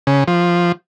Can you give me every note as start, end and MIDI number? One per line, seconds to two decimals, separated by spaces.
0.07 0.24 49
0.27 0.72 53